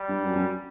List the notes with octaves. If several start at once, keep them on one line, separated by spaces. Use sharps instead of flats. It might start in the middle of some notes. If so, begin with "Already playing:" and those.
Already playing: G3
G2
F#2
F#2